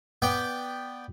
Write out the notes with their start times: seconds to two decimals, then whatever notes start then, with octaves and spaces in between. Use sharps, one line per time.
0.22 B3 D5 G5